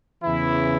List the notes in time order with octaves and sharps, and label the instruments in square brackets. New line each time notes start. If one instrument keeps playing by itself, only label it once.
[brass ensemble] E2 C#3 E3 E4